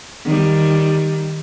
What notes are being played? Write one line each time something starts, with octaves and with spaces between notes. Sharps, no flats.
D#3 G3